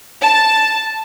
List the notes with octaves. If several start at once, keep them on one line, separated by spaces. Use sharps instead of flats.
A5